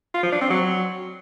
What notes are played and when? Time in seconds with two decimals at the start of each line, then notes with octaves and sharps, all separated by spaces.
0.14 F4
0.23 F3
0.32 D4
0.41 C4
0.50 F#3